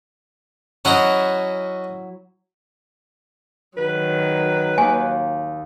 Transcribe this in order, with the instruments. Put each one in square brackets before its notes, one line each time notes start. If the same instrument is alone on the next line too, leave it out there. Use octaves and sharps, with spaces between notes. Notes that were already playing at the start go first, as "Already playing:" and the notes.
[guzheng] F#3 E4 [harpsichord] C#4 F#4 D#5
[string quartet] D#3 F#3 [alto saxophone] B4
[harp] D#2 [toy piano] G#5